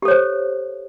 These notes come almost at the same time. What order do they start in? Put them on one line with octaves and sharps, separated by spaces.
G4 A4 C#5 C5